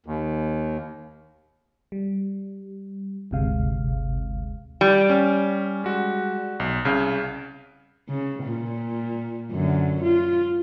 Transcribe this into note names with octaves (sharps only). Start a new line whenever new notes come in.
D#2
G3
G1 D2 C3 G#3 F5
G3
C#4
G#3 F#4
B1
C2 C#3 F5
C#3
A#2
F#2 D3
F4